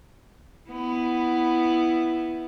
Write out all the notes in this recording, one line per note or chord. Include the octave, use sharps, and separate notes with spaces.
B3 E4